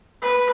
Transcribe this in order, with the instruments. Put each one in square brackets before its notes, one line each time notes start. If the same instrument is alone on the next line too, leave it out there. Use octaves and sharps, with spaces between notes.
[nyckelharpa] B4